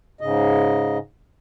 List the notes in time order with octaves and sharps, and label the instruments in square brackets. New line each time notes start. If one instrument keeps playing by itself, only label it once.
[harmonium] G#2 C#3 D#5